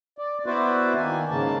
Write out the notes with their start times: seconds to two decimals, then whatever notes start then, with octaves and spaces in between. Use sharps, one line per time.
0.18 D5
0.46 B3 E4 F#4 B4 C5 D5
0.96 D#3 A#3 G#5
1.30 G#2 C#3 A#3 A5